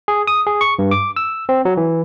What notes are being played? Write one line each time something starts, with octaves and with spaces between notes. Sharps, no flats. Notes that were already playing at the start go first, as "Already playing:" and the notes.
G#4
D#6
G#4
C#6
G2
D6
E6
C4
F#3
E3